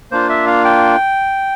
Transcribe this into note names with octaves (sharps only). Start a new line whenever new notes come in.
A#3 D4 F4 C5
E5
F5
G5